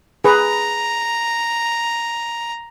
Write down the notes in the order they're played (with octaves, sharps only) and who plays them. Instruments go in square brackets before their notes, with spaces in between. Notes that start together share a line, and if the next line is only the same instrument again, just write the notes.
[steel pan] G#4 B4 [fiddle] A#5